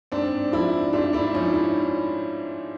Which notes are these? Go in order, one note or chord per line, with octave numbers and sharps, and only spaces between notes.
G#2 C4 D4
F3 D4 E4
G#2 D4 E4
D4 E4
F3 C#4 D#4
E4